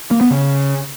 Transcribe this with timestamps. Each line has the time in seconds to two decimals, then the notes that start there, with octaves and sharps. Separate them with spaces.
0.11 A#3
0.21 B3
0.31 C#3